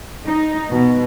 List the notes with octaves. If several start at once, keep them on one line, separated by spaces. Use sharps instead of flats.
D#4
B2